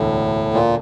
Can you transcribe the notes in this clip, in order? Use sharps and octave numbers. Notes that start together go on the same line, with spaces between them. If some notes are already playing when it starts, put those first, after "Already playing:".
Already playing: E1 D2 A2 D3
A#2